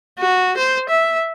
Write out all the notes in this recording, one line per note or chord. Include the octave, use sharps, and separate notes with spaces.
F#4
C5
E5